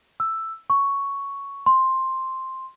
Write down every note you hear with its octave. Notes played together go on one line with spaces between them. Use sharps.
E6
C#6
C6